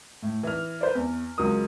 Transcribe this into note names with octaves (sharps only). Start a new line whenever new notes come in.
A2
E3 F6
B4 C5 D5
E2
C#2 F#3 G#3 A#4 D#6